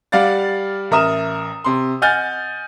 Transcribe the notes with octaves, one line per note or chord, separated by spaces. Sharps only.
G3 D5 F5 F#5 A6
A1 A#4 E5 D#6 E7
C3 C6
D#5 F#5 G#5 F6 G6 A6